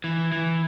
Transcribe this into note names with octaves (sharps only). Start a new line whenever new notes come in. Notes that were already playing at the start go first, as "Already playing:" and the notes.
E3
E3